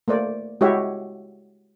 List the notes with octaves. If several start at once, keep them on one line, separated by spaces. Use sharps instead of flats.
A3 A#3 C5 D5
G#3 E4 F#4 G4 C#5 E5